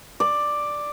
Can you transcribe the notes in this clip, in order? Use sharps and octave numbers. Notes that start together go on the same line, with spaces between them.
D5